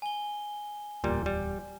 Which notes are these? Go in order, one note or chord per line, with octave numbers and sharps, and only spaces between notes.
G#5 G7
D1 E2 A#2 G3
G3